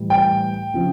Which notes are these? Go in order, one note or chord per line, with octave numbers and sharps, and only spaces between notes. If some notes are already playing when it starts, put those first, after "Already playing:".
Already playing: A2 E3 G3
G5
C#3 F3